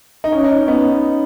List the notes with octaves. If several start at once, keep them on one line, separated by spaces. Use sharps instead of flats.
D#4
C#4
D#4
C#4
B3